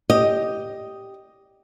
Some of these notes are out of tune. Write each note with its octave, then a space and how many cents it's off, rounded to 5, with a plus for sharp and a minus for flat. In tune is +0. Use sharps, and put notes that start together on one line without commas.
G4 +0 D#5 +0